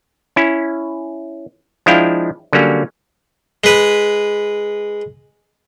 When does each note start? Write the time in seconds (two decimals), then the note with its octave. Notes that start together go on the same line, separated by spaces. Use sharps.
0.36 C#4 E4
1.86 F3 G#3 D4 E4 F5 G5
2.53 D3 F#3 G3 A#3 C#4
3.64 G#3 B4